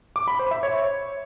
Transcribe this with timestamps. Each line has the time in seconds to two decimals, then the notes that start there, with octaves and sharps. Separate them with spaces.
0.16 D6
0.28 B5
0.39 C5
0.51 E5
0.63 C#5